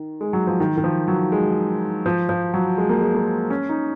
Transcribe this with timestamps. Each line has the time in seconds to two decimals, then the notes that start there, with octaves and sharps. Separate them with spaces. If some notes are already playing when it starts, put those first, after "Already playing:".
Already playing: D#3
0.21 G#3
0.33 F#3
0.47 F3
0.60 D#3
0.77 D#3
0.84 F3
1.08 F#3
1.32 G#3
2.06 F3
2.29 F3
2.54 F#3
2.78 G#3
2.89 A#3
3.01 G#3
3.15 A#3
3.50 C#4
3.69 D#4